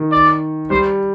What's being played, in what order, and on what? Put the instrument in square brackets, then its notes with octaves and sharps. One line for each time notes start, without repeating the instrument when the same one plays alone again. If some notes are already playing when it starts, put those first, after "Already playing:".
Already playing: [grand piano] D#3
[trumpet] D5
[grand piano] G3 [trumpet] C5